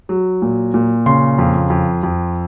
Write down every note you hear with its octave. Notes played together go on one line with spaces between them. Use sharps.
F#3
A#2
A#2
C#3 C6
F2
F2
F2